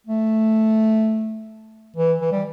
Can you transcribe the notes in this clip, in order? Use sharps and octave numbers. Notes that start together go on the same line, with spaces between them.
A3
E3
E3
G3